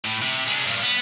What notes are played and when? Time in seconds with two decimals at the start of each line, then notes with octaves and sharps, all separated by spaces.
0.06 A2
0.22 C3
0.48 G#3 D4
0.66 G2 A#2
0.83 B3